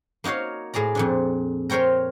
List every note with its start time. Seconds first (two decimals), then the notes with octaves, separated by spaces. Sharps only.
0.24 A#3 D#4 F#4 C#5 F5
0.74 A2 G#4 D5 A#5
0.95 F2 A#2 D4
1.70 A#4 C5 C#5 G5 A#5